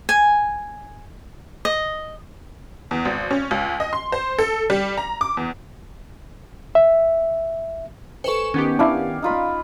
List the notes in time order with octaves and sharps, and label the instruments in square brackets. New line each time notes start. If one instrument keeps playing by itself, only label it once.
[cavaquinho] G#5
D#5
[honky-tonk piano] E2
G#1
C#4
C#2
D#5
C6
C5
A4
G3
A#5
D6
E2
[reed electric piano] E5
[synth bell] A4 B4 C5 [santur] G#5 C#6 [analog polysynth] C#7 E7
[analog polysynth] D#3 B3 G4 [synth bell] C#4
[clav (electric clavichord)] D4 E4 [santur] D5 F5 G#5
[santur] D#4 F4 B5